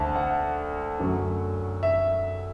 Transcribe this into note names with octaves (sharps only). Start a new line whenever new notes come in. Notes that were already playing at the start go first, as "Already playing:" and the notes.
Already playing: D2 D3 C4 A5
F#5
F#2 D3 F#3 A3
E5